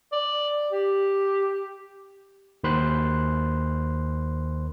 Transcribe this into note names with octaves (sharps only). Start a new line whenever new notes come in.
D5
G4
D#2 D#3 C5 B5 C6 F#6